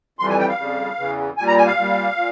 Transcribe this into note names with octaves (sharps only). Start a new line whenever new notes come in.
F2 E3 G3 C6
G#5
G5
F5
F2 C#3 G3
E2 C#3 E3
A#2 G3 G#5
A#5
G#5
F5
A#2 G3
A#2